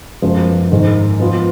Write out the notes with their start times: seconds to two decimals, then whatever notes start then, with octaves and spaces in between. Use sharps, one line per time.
0.22 F#2 F3 G#3 B3
0.71 G#2 D#3 G#3
1.20 F3 B3 F4